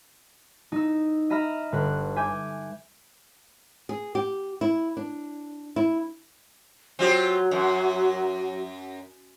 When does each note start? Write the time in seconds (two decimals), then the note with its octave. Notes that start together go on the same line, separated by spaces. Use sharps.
0.72 D#4 E6
1.30 D#5 E5 A#5 B5 F6
1.72 G1 B4
2.16 E5 G#5 D6 G6
3.89 G#4
4.15 G4
4.61 E4
4.97 D4
5.76 E4
6.99 F#3 C4 F4 G4
7.51 F#2